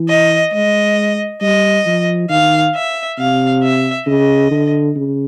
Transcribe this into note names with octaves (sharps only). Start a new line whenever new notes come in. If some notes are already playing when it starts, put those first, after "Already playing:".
Already playing: E3
D#5
G#3 D#5
G3 D#5
F3
D#3 F5
E5
C3 F5
E5
C#3 D#5
D3
C#3